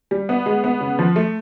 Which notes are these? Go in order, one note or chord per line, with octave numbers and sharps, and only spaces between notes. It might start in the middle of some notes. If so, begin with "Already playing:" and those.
G3
B3
G#3
B3
C#3
F3
A3